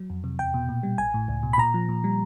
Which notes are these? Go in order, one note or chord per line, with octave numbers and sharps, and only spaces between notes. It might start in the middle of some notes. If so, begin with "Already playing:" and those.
Already playing: F#3
F2
C3
E2 G5
B2
A#2
G3
A1 G#5
A2
C#2
B2
B5
A#2 A#5
F3
A#2
G3